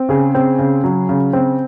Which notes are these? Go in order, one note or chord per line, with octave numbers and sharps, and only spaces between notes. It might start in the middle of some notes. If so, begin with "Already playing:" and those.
Already playing: C4
C#3 G#4
C4
C#3
F#3
C#3
C4